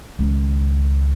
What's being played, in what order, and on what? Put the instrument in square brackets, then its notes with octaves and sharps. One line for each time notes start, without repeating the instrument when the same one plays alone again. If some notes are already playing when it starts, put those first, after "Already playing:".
[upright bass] C#2 D#3